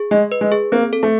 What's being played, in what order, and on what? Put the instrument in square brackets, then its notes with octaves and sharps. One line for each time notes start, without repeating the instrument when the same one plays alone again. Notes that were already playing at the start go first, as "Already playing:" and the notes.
Already playing: [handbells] G#4
[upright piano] G#3 [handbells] D#5
[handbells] B4
[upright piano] G#3
[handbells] G#4
[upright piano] A#3 [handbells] C4
[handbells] A4
[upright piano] A3